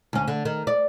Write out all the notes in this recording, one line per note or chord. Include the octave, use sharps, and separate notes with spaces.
D2 C#4
D3
D#3
D5